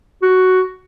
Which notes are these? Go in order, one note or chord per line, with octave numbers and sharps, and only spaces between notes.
F#4